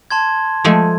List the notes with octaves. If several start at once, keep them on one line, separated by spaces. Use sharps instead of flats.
A5 C6 G#6
F3 G#3 A3